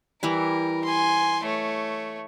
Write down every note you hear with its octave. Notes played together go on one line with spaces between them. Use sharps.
E3 G3 E4 A#4
G#5 C6
A3 C#5